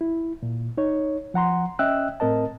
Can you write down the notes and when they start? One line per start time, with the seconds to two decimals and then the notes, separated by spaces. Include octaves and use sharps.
0.01 E4
0.43 A#2
0.78 D#4 C#5
1.34 F3 F#5 A#5 C6
1.79 C#4 D#5 E5 G5 E6 F#6
2.20 A2 C4 A#4 D#5 A5